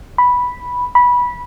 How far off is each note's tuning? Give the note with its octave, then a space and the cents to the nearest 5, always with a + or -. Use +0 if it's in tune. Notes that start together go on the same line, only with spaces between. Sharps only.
B5 -5
B5 -15